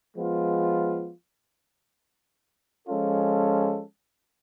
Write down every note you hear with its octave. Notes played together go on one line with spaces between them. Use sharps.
F3 G#3 B3 F4
F3 G#3 C#4 F4 A4